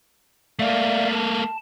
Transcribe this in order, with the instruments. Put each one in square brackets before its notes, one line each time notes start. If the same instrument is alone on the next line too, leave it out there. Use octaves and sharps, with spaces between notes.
[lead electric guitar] A3 A#3 [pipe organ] D5 E5 F5
[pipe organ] A5